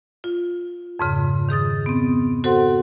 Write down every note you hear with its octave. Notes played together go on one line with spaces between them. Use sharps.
F4
F2 G#2 C#3
D#3 G#4 D#6 A6
B3 C4
F#4 A4 C5 F#5 C6